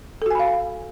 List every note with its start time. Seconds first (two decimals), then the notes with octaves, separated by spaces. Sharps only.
0.22 A4
0.26 F#4
0.31 G#5
0.35 B5
0.39 F5